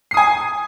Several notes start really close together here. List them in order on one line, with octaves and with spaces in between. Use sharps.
C7 D#6 G#5